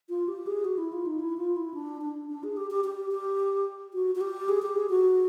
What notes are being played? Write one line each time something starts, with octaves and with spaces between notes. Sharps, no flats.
F4
G4
G#4
F#4
E4
F4
D#4
E4
F4
E4
D4
D4
D4
G#4
G4
G4
G4
G4
F#4
F#4
G4
G#4
G4
G#4
F#4